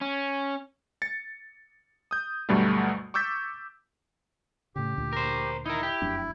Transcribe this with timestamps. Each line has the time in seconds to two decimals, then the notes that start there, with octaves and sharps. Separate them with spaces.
0.01 C#4
1.02 A6 C#7
2.11 D#6 G6
2.49 D2 G2 B2 F#3 G3 A3
3.14 C#6 D6 E6 G6 A6 B6
4.76 A2 C#3 G4
4.98 D2 A#2
5.13 A#4 C5
5.66 D#4 E4 A#4
5.83 G4
6.02 F1 F#2 D4